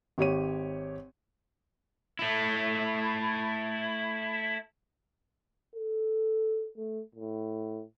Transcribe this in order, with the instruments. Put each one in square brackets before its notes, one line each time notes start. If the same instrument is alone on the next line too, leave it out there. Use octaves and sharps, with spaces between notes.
[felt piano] G#1 G4 C#5 D#7
[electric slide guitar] A3 E4
[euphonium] A4
A3
A2